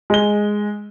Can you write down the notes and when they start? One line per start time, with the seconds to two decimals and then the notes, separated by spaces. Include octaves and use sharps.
0.10 G#3 G7